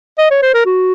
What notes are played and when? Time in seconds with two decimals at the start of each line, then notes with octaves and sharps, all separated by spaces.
0.18 D#5
0.31 C#5
0.43 C5
0.54 A#4
0.66 F#4